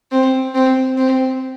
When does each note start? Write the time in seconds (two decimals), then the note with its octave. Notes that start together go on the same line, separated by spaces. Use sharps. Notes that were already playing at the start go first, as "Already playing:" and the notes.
0.11 C4
0.54 C4
0.97 C4